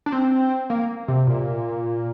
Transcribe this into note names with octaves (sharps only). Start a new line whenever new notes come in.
D4
C4
A#3
C3
A#2